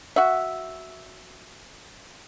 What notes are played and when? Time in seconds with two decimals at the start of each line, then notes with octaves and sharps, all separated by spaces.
0.16 F#4 E5